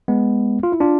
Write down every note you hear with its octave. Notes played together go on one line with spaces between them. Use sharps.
G#3 B3
F4
E4
D4 F4